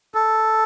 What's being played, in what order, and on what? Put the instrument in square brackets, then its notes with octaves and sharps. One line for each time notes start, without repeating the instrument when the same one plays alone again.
[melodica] A4